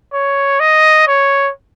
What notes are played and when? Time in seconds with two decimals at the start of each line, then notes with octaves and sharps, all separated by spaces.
0.13 C#5
0.60 D#5
1.07 C#5